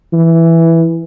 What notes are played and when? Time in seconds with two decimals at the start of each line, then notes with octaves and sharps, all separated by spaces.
0.13 E3